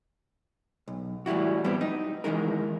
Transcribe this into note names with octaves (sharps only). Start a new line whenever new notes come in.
B1
A2 E3 G3 E4 F#4
G3 B3 C4 G4
D#4
D#2 A2 E3 G#3 D#4 A#4